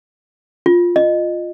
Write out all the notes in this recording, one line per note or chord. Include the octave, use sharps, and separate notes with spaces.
F4
D#5